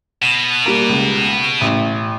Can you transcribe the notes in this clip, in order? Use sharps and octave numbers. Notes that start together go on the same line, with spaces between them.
B2
G3 A#3
C#2
A1